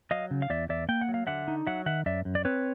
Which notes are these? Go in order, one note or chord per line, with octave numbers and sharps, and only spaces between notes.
F#3 D#5 F5
C#3
F5
E2 D5 E5
E2 D5 E5
A#3 G5
F#5
F#3
F5
D3 E5 F#5
D#4
F#3 E5 F#5
D#3 E5 F#5
F#2 D5 E5
F#2
D5
C4 B4 C#5